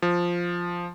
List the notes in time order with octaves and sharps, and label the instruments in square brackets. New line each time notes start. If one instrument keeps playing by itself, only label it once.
[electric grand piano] F3